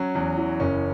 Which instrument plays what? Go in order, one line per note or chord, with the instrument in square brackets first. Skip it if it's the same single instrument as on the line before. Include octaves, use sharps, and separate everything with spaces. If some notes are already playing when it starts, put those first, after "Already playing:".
Already playing: [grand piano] F#3 C#4
E2
E3
F#1 C#4